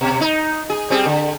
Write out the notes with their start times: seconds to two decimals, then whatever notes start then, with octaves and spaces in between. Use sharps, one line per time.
0.01 B2
0.21 D#4
0.70 G#4
0.90 G3 C4 G#4
1.05 D3